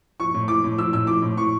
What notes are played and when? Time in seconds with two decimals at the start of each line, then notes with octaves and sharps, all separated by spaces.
0.20 F3 C#6
0.34 A2
0.48 F3 D6
0.64 A2
0.78 F3 E6
0.93 A2 E6
1.07 F3 D6
1.22 A2
1.37 F3 C#6